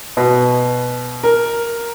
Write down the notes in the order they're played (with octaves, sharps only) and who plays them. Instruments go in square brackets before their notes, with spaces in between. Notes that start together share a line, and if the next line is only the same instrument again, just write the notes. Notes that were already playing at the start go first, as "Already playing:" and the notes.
[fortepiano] B2
[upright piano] A#4